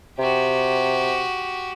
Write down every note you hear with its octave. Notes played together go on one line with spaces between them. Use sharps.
C3 F#4 G4